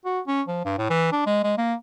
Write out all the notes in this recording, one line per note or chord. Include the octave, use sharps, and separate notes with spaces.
F#4
C#4
F3
G2
A2
E3
D4
G#3
G#3
A#3